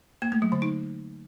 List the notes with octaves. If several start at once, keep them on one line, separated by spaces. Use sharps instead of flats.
A#3
A3
F#3
D3
D#4